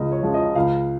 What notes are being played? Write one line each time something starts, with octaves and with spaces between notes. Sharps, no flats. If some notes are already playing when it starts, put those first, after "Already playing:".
Already playing: C#2 C#3 F3 G#3 D#5
C#5
C#3 F3 G#3
D#5
C#2 F5